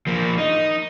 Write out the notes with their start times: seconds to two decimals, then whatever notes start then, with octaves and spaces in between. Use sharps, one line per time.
0.07 F3 A#3
0.38 D#4